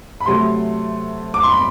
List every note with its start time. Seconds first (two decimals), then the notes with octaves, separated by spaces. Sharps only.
0.20 B5
0.26 C3 F#3 A3 C6
1.34 D6
1.43 C6
1.51 B5